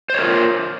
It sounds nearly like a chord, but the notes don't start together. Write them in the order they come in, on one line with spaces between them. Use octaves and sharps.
C5 C#5 A#4 F4